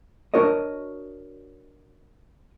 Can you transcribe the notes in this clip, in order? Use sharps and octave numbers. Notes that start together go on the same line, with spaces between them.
D4 F#4 A#4 C#5 D#5